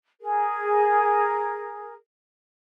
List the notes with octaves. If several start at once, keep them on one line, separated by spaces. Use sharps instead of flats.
G#4 A#4